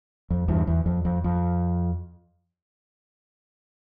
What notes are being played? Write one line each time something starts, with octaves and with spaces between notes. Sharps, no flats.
F2
E2 G2
E2
F2
F2
F2